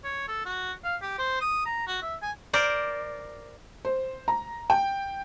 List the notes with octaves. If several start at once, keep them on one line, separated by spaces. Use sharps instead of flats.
C#5
A4
F#4
F5
G4
C5
D#6
A#5
F#4
E5
G#5
A#4 C5 D5
C5
A#5
G5